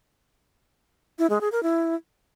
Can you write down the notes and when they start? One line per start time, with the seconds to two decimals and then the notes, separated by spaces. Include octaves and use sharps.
1.19 E4
1.30 G#3
1.41 G#4
1.52 A#4
1.63 E4